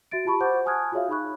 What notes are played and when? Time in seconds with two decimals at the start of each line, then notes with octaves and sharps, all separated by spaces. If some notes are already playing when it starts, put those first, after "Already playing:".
0.11 F#4 E5 A6 D7
0.25 F4 G4 A5 B5 C#6
0.40 C5 F#5 C#6 D6 G6
0.66 G#5 A5 D#6 F6 F#6 G#6
0.92 F4 F#4 G#4 C#5 E5 F5
1.08 D#4 G#4 B5 C#6 F#6